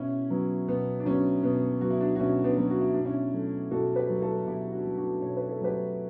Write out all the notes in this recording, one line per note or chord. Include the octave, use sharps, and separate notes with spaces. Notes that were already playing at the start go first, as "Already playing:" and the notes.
Already playing: B2 C#4 E4
F#3 B3
B2 B3
D4
F#3 B3 C#4
B2 B3
F#3 B3 F#4
E4
D4 F#4
F#4
B2 C#4 E4
B3 D4
F#3 B3
F#4
E4
B2 D4
C#4 E4
F#3 A3
B2 F#4 A4
G4 B4
F#3 A3
F#4 A4
B2 E4 G4
D4 F#4
F#3 A3
D4 F#4
B2 C#5
B4
A4
F#3 A3 G4 B4